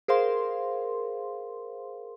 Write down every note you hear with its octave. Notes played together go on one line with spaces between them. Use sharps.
G#4 A#4 C5 F5 C6